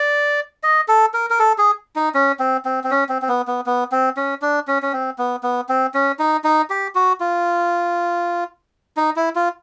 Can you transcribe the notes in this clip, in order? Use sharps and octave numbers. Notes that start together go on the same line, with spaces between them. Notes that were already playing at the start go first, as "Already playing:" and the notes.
Already playing: D5
D#5
A4
A#4
A#4
A4
G#4
D#4
C#4
C4
C4
C4
C#4
C4
C4
B3
B3
B3
C4
C#4
D4
C#4
C#4
C4
B3
B3
C4
C#4
D#4
D#4
G4
F#4
F4
D#4
E4
F4